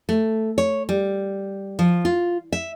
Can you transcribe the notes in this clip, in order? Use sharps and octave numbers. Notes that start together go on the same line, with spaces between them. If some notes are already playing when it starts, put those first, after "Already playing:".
A3
C#5
G3
F3
F4
E5